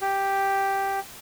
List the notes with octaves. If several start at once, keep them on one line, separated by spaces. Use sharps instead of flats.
G4